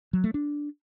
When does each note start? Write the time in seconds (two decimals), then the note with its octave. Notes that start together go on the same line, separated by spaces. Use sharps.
0.13 F#3
0.24 A3
0.34 D4